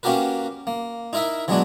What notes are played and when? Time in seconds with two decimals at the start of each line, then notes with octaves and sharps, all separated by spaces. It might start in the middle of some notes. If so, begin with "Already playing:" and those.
0.03 A#3 C#4 F#4 G4 A#4 B4
0.67 A#3
1.13 D#4 E4 A#4 D#5 E5
1.48 E3 F#3 G#3 B3 D4 F#4